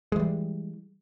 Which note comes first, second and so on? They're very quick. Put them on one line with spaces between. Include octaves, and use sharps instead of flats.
G#3 E3 G3